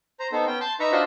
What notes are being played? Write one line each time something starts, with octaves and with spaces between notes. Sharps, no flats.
C5 A#5
B3 D#4 A4 C5
B3 C#4 G5
A5 C6 G6
D#4 B4 E5 A#5 C#6
D4 F4 F#4 C5 D#5 E5